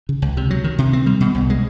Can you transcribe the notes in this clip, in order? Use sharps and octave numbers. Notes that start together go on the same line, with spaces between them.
C#3
C#2
C3
F#3
D#3
C3
C4
G3
B2
C2
G#3